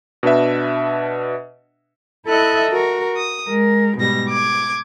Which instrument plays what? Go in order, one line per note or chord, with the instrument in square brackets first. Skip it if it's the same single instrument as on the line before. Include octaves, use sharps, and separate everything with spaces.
[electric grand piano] B2 D4 B4 E5
[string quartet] E4 A4 D#5 E5 F#6
F#4 A#4
D#6
G#3 A#4
G#2 B2 G3 A#6
D6 G#6